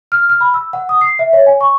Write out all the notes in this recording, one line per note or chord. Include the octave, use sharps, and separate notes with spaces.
F6
F6
B5
E6
F#5
D#6
C7
E5
C#5
G#5
C#6